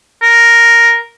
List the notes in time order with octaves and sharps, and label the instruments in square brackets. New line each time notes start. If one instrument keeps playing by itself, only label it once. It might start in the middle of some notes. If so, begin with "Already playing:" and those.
[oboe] A#4